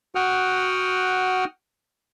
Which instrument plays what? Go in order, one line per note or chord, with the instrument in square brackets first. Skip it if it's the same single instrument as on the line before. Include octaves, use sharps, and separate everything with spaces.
[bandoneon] F#4 F#5 G5 D#6 F6